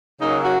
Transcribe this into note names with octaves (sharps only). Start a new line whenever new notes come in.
C#3 F#3 A#3 D#4
F#4